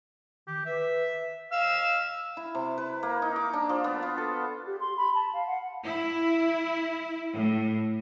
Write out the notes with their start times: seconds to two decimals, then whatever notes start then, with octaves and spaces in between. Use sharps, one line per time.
0.47 D#3 G4
0.66 B4 E5
1.52 F5 E6
2.37 E4
2.55 C3
2.78 B4
3.03 A#3
3.22 D#4
3.36 D6
3.53 D4
3.69 F3
3.84 B3
4.03 F4
4.18 A4
4.67 G4
4.80 C6
4.97 B5
5.15 A5
5.33 F5
5.46 F#5
5.85 E4
7.33 A2